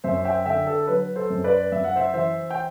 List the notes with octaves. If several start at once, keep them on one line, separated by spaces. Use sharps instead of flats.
F#2 C5 E5
E5 G5
D3 E5 G5
A4
F#3 B4
A4 C5
F#2
B4 D5
F#2 E5
F#5
C5 E5
E3 C5 E5
G5